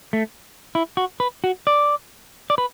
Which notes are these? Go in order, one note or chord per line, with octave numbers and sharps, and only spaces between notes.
A3
E4
F#4
B4
F#4
D5
D5
B4